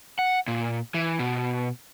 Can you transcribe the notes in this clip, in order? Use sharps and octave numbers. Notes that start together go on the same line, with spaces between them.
F#5
A#2
E3
B2